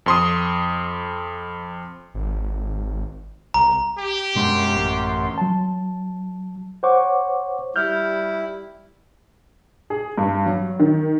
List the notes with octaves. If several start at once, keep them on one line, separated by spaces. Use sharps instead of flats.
F2 C6 D#6
G#1
C2 A#5
G4
F#2 B2 G#3 A#3 C6
A1
F#3 A5
C5 C#5 F#5 C#6 D6
G3 E4 F6 G6
G#4
G2
F#3
D#3